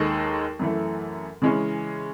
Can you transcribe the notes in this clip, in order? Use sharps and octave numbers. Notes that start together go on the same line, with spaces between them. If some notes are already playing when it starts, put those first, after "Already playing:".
Already playing: D#2 D#3 G#3 D#4 A4
F#2 E3 A3
C#3 E3 G#3 C#4